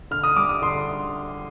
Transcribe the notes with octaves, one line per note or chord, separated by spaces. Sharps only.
D3 F6
D#6
G3 D6
D#6
D3 C6